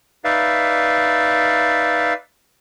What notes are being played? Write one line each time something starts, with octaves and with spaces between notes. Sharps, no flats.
D#4 B4 D5 E5 F5